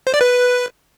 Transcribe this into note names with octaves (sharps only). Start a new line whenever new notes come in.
C5
D5
B4